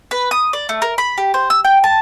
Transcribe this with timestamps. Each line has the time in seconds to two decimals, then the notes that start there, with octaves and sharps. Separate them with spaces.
0.11 B4
0.31 D#6
0.53 D5
0.69 A3
0.82 A#4
0.98 B5
1.18 G4
1.34 C5
1.50 E6
1.64 G5
1.84 A5